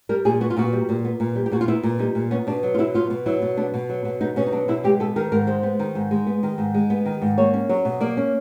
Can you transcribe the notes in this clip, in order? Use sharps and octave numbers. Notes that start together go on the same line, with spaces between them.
G3 A#4
A#2 G#4
B3 F#4
F4
A#2 F#4
G3
A#2
B3
A#2
G3
G4
A#2 F#4
F4
B3 E4
A#2
G3 D#4
A#2
B3 C#4
B2 D4
F#3
F4
B2 E4
B3 F4
B2
F#3 E4
B2
B3 D4
B2
F#3
B2
B3 D#4
B2 C#4
D#4
F#3 D4
B2 E4
G#3 G4
B3 A4
D#3 A#4
G#2 A#4
G#3 C5
B3
D#3
G#2
G#3
B3
D#3
G#2
G#3
B3
D#3
G#2
A#3 C#5
C#4
F#3 C#5
B2
A#3 D5
C#4